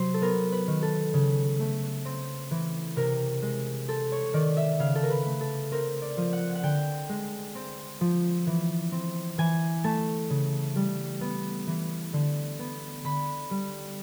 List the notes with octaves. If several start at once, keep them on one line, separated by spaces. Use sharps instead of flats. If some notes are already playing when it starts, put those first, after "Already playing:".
Already playing: C3 F#3 C5
A4
B3 A#4
B4
D#3
A4
C#3
A3
C4
E3
C3 A#4
G#3
C4 A4
C#5
D#3 D5
E5
C#3 F5
A4
A#4
B4
A3
A4
C4 A#4
D5
F3
F#5
F#5
D3 G5
G#3
C4
F3
E3
C4
E3 G#5
A3 A5
C#3
G3
B3
E3
D3
B3
D3 B5
G3